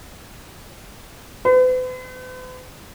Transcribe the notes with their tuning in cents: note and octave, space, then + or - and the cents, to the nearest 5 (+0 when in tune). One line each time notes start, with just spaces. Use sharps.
B4 +45